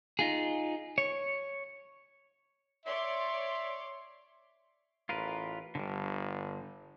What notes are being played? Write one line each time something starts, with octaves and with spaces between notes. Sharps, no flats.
D#4 F4 G#4
C#5
C#5 D5 E5 C6
A1 F4 A#4 B4
G1 D3 G3